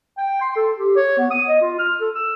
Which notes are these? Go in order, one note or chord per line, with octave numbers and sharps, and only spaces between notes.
G5
C6
A4
G4
C#5
B3
D#6
D#5
F4
F6
A4
E6